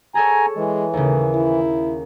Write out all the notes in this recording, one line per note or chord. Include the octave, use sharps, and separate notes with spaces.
G#4 A4 C#5 G#5 A#5
E3 G#3
D#2 A2 C#3
E4